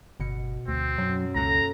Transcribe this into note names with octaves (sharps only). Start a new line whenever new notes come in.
G1 B2 C#7
D2 C4
F#2 F#3
C#2 A#3 F#4 A4 A#5